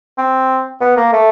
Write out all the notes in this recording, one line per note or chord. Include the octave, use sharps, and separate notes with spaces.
C4
B3
A#3
A3